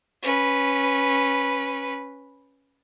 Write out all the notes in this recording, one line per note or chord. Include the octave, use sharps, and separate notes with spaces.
C#4 B4